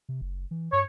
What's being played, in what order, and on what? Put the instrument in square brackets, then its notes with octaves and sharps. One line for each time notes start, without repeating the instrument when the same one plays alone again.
[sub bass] C3
F#1
E3
[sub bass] G2 [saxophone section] C#5